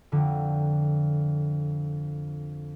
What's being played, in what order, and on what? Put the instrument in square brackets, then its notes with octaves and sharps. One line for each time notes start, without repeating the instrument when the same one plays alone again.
[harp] F2 D3